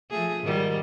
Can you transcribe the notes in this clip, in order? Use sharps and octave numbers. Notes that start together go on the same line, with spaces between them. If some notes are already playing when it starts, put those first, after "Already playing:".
F3 A3 G#4
G#2 D#3 G3